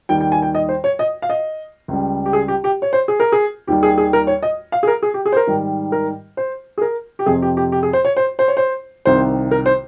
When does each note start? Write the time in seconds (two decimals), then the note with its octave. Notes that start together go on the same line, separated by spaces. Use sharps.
0.09 D#2 D#3 G3 G5
0.21 G5
0.32 G#5
0.42 G5
0.55 D#5
0.69 C5
0.84 C#5
0.99 D#5
1.22 F5
1.29 D#5
1.88 C#2 C#3 G3
2.26 G4
2.33 G#4
2.48 G4
2.64 G4
2.82 C#5
2.93 C5
3.08 G#4
3.20 A#4
3.32 G#4
3.67 D#2 D#3 G3 G4
3.83 G#4
3.98 G#4
4.13 A#4
4.27 C#5
4.43 D#5
4.72 F5
4.83 G#4
4.87 A#4
5.03 G#4
5.14 G4
5.26 G#4
5.32 C5
5.37 A#4
5.47 G#2 D#3 G3
5.92 A#4
6.37 C5
6.78 G#4
6.81 A#4
7.19 G4
7.26 F2 C3 F3 G#4
7.42 G4
7.57 G4
7.72 G4
7.83 G#4
7.93 C5
8.05 C#5
8.17 C5
8.39 C5
8.48 C#5
8.57 C5
9.05 C2 C3 D#3 C5
9.51 A#4
9.66 C5